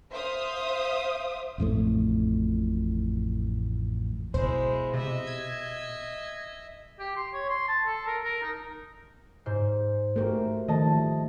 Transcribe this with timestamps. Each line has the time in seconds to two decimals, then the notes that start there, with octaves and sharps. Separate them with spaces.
0.13 C5 E5 F5 D#6
1.58 A1 F2 A2 A3
4.34 B2 G#3 E4 C5
4.94 C3 D#5 E5
5.27 G#6
7.00 G4
7.17 C6
7.33 C#5
7.49 C6
7.68 A5
7.87 A4
8.07 A#4
8.24 A#4
8.43 D#4
9.46 G#2 C5
10.16 A3 F#4 G4 A#4 C5
10.68 D#3 F3 A3 D#5 A5